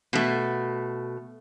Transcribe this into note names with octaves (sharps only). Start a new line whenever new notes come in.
B2 A3